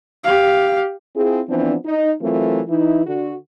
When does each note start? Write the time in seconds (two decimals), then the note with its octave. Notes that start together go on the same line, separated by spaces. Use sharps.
0.24 G4 F5
1.15 C4 E4 F4 G#4
1.48 E3 F3 B3 C4 D4
1.85 D#4
2.21 E3 F#3 A3 C4 F4 A#4
2.68 E3 D#4 E4
3.06 D3 F#4